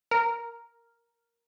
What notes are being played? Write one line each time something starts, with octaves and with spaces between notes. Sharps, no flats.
A#4